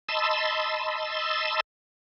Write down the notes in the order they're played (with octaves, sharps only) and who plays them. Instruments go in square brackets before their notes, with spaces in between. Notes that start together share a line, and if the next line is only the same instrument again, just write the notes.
[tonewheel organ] D#5 A5 B5 C6 E6